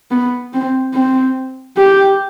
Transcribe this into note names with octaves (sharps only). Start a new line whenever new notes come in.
B3
C4
C4
G4